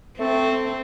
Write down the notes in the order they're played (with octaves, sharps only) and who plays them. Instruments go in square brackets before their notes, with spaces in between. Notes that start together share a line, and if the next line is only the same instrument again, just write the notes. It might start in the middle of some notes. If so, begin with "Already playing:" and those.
[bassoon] A3 [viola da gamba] C4